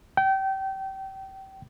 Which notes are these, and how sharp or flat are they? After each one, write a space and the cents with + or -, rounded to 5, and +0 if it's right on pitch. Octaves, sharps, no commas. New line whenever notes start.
G5 -25